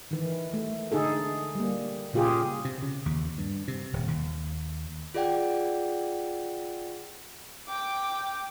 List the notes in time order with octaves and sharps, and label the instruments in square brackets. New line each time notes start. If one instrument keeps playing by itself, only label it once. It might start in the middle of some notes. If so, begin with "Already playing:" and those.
[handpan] D#3 E3
A3
D3 D#4 G#4 A4
G3 A#3
A#2 C#3 F4 G4 G#4
[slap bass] C3
C#3
D#2
G2
C3
D#1
D#2
[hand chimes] F4 G#4 D5 F#5 G5
[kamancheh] G5 D6